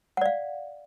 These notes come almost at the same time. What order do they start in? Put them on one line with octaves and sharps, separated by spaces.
F#5 D5 F5